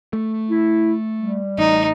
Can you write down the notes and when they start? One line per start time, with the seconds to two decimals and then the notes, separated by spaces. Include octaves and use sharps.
0.13 A3
0.50 E4
1.18 G3
1.58 A1 D#4